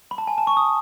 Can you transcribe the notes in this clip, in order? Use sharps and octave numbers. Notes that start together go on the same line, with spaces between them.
B5
A5
G#5
A5
C#6
D#6